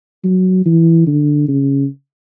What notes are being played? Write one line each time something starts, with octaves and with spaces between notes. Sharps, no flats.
F#3
E3
D3
C#3